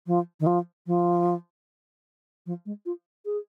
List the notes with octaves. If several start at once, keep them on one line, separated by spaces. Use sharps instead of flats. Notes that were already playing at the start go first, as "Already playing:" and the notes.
F3
D#3
F3
F3
F3
G#3
F4
G#4